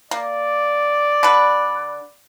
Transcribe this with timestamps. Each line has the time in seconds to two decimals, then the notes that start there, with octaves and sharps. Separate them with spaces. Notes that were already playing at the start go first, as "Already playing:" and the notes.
0.11 A#3 D5
1.23 D3 B4